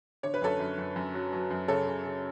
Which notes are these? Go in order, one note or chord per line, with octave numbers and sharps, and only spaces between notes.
D3 C#5
B4
F#2 A4 C#5
F#2
F#2
F#2
F#3
F#3
F#2
C#3 A4 C#5
C#3
C#3